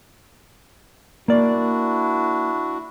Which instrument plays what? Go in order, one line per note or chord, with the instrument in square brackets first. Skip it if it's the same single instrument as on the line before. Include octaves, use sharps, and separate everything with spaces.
[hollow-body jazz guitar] A#3 D5 [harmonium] D4 E4 F#4